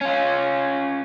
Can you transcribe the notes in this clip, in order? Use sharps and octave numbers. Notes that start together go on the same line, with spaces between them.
C#4 F4